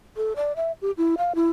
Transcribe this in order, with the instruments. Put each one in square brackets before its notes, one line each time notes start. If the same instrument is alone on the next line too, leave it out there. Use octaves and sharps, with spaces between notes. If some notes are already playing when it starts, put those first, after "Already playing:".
[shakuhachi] A4
D5
E5
G4
E4
F5
E4